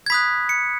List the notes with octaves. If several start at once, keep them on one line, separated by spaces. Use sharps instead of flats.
G#6
B5 D#6 F#6 B6
C#7